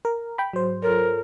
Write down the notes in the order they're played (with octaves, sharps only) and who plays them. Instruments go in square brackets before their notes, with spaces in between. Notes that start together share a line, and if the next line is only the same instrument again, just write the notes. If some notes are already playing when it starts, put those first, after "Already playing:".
[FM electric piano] A#4
G5 B5
[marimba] G#2 [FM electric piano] F#3 C5
[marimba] F4 A4 C#5 [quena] A#4